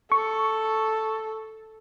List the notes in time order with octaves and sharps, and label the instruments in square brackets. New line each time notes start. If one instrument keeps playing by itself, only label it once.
[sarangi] A4 [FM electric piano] C#6